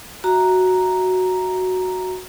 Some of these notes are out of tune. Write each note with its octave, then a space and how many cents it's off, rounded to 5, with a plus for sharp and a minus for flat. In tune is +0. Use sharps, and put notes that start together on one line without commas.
F#4 +0 E5 +0 A#5 +0